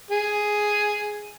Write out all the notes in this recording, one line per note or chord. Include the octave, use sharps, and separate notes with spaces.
G#4